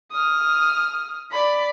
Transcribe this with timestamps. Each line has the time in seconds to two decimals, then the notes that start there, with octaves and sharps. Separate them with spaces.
0.11 D#6 F6
1.31 D5 B5